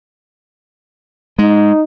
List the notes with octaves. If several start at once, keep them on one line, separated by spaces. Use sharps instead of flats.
G#3 D#4